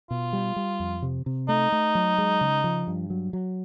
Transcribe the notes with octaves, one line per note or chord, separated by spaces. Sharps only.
B2 F4
G3
G3
F2
C3
C3
A3 D#4
A3
F#3
G#3
C#3
F3
G2
F#3
F#3